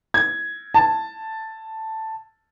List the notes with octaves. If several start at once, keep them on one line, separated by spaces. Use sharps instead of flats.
G#6
A5